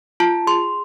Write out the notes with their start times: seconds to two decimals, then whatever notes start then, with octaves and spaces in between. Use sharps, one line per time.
0.20 F4 A5
0.47 G#4 C6